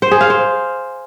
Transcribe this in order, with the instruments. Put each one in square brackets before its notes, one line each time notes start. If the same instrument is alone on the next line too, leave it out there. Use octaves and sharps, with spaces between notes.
[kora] C5
G#4
F5
C5